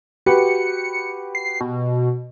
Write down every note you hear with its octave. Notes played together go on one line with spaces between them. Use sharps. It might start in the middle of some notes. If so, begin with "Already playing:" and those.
F#4 G4 B4 C#7
C7
B2